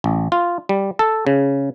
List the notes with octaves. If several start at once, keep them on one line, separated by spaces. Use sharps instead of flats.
A1
F4
G3
A4
C#3